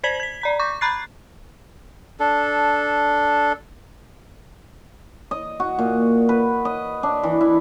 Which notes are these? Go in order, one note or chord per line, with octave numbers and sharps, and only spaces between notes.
C5 D5 G#6 B6 F#7
G#6 B6
D5 A#5 B6
C#6 D6 G6
A#5 B5 F#6 A6 C7
D4 A4
D#5
F#4
A#2
B4
D#5
D4
E3
E4